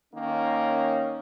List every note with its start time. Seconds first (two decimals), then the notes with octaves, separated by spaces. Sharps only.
0.13 D#3 A#3 C#4